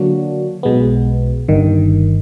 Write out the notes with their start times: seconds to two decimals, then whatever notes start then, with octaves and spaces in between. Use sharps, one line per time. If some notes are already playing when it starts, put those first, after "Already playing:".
Already playing: D3 F#3 A#3 D4 F#4
0.63 B1 B2 G#3 B3
1.49 G1 G2 D#3